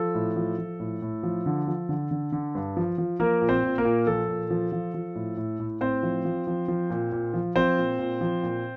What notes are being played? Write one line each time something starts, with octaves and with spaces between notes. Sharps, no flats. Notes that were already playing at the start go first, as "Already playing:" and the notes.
Already playing: F3 A4
A2
F3
F3
A2
A2
F3
D3
F3
D3
D3
D3
G2
F3
F3
F3 A#3 A#4
A#2
C4 C5
A#2
A#3 A#4
A#2
F3 A4
A#2
F3
F3
F3
A2
A2
A2
A2 C4 C5
F3
F3
F3
F3
A#2
A#2
F3
F3 C4 C5
A#2
A#2
F3
A#2